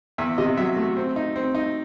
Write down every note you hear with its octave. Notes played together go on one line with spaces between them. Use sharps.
E2 E5
C3 D#5
F#3 E5
A3
C4
D#4
C4
D#4